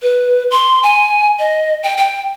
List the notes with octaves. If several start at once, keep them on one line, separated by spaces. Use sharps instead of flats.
B4
C6
G#5
D#5
G5
G5